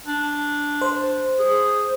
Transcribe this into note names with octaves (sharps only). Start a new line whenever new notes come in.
D4
C5
G#4